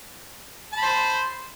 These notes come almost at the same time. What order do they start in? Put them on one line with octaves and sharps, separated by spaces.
A5 B5 C5